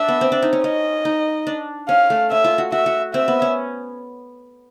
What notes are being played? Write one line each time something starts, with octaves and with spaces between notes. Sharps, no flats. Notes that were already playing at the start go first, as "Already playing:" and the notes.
Already playing: D4 E5
B3
C4
D4
D#4
C#4
C#4 D#5
D#4
D4
C#4 F5
A3
C#4 E5
F4
F#4
F#4 E5
F#4
C4 E5
B3
C#4